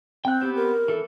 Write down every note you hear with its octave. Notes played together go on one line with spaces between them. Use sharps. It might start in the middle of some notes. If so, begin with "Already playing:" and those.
C4 G5 F#6
B3 G4 C5
A#4
E3 A4